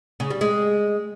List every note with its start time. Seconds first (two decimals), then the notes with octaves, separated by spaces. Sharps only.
0.20 C#3
0.30 G3
0.41 G#3